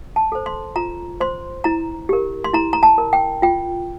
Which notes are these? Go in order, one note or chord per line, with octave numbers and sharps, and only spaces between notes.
A5
A4 C5
C6
F4 A#5
C5 C6
E4 A#5
G4 A#4
C6
E4 A#5
A#5
A5
A#4
G5
F4 G5